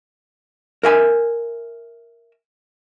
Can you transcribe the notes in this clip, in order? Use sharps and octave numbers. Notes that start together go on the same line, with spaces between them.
A#4 E5 G#5